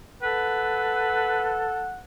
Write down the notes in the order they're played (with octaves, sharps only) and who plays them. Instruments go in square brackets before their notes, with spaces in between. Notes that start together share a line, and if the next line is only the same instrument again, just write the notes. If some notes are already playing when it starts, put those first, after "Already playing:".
[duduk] A4 [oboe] B4 [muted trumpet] F#5